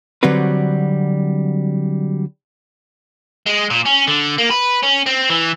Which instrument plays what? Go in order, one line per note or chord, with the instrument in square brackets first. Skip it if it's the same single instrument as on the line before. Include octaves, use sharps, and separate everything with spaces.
[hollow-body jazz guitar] D3 F#3 G3 C4 F#4 B4
[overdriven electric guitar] G#3
A#2
C#4
D3
A#3
B4
C#4
C4
E3